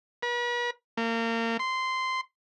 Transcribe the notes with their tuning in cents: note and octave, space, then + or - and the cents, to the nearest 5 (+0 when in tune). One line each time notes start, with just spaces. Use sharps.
B4 -40
A#3 -30
C6 -10